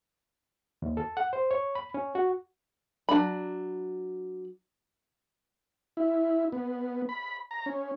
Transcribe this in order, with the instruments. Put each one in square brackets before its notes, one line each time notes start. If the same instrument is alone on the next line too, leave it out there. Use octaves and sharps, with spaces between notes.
[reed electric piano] D#2
A4
F#5
C5
C#5
B5
C#4
F#4
[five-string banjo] F#3 D4 B5
[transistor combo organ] E4
B3
B5
A#5
C#4